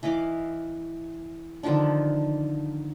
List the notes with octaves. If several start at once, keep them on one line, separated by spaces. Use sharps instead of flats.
E3 D#5 F5 D6
D3 D#3 F3 D4